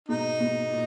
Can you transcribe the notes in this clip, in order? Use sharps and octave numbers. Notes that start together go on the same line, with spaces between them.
G#2 B2 D#4
G#2 B2
A#2